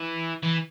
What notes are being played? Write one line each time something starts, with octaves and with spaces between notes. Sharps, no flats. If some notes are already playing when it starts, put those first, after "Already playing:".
Already playing: E3
E3